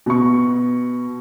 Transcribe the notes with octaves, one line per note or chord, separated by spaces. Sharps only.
B2 C#6